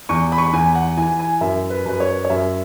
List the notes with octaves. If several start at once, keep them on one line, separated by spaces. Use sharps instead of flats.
E2 C#6
B5
C#6
B5
E2 G#5
F#5
E3 G#5
G#5
F#2 E5
B4
F#2 B4
C#5
C#5
F#2 E5